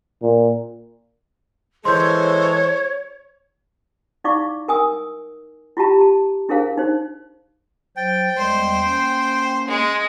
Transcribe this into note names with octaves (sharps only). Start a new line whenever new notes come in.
A#2
E3 G#3 A4 C5 C#5 C6 G6
D#4 E4 D5 F5 C#6 D6
A#4 G#5 D#6 E6
E4 F4 G4 A5 A#5
A5
D4 E4 G#4 A#4 C5 F5
D#4 C5
F#3 C5 G5 A6
E2 G3 G#3 C5
A#3 C#4
G#3